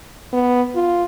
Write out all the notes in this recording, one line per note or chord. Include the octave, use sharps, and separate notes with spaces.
B3
F4